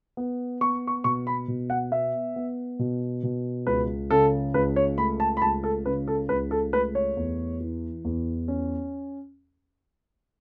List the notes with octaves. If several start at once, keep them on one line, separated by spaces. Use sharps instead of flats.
B3
B3 C#6
C#6
B2 C#6
B5
B2
F#5
B3 E5
B3
B2
B2
C#2 B4
C#3 A4
C#2 B4
C#5
A3 B5
A5
B5
C#2 A5
A4
C#3 B4
A4
C#2 B4
A4
A3 B4
C#5
E2
E3
E2
C#4